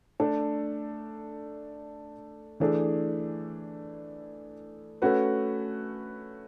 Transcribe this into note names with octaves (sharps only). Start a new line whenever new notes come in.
A3 D4 A4
E3 A3 D4 G#4
A3 C#4 F#4 B4